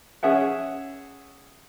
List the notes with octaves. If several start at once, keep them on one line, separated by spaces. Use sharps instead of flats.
C#4 G#4 E5 F#5